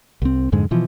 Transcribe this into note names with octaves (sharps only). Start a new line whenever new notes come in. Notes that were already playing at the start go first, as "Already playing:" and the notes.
C2 C4
F2 G#2 D3 G#3
B2 E3 F3